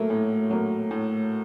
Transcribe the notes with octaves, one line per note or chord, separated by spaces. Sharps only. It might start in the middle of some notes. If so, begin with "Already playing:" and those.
Already playing: F#3 A3 A#3
A2
F#3 A#3
A2